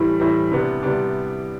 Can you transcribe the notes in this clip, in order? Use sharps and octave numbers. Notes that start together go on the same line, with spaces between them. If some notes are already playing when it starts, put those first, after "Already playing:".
Already playing: A2 E3 G3
A2 E3 G3
C3 G3 B3 D4
C3 G3 B3 D4